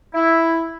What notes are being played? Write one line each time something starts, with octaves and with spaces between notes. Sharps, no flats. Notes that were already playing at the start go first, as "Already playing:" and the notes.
E4